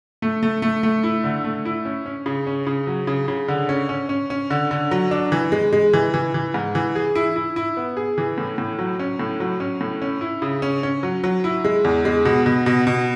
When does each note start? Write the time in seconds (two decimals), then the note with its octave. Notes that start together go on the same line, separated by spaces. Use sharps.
0.22 A3
0.43 A3
0.62 A3
0.83 A3
1.03 E4
1.24 D3
1.44 A3
1.65 E4
1.85 C#4
2.06 C#4
2.26 C#3
2.47 C#4
2.67 C#3
2.87 F#3
3.07 C#3
3.28 C#3
3.48 D3
3.69 C#4
3.89 C#4
4.09 C#4
4.30 C#4
4.50 D3
4.71 D3
4.91 F#3
5.11 D4
5.32 E3
5.52 G#3
5.73 G#3
5.93 E3
6.14 E3
6.34 E3
6.54 G#2
6.75 E3
6.95 G#4
7.15 E4
7.36 E4
7.56 E4
7.77 B3
7.97 G#4
8.18 E3
8.38 A2
8.58 A2
8.79 F#3
8.99 C#4
9.20 A2
9.40 F#3
9.60 C#4
9.81 A2
10.02 C#4
10.21 E4
10.42 C#3
10.62 C#4
10.83 C#4
11.03 F#3
11.24 F#3
11.44 E4
11.65 G#3
11.85 E2
12.05 G#3
12.25 B2
12.46 B2
12.66 B2
12.87 B2